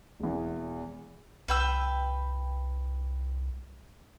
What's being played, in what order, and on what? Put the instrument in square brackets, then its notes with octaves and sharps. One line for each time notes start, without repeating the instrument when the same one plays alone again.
[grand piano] E1 E2
[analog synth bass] C2 [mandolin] B4 G5 E6